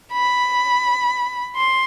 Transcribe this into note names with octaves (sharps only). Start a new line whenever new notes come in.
B5
C6